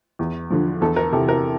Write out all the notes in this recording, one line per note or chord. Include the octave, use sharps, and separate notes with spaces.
E2
D3 F3
E2 A4
A#4
C3 E3 A4
A#4